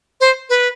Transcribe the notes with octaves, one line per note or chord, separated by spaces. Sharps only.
C5
B4